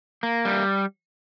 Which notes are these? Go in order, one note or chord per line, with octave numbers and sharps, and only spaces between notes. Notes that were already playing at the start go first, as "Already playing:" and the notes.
A#3
G3